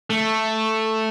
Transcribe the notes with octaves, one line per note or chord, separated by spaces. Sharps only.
A3